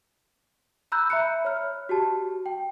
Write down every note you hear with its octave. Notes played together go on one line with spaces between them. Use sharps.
A#5 B5 E6 F#6 G6
E5 A#5 B5 F#6 C#7
C#5 F6
F#4 G4 A5
G5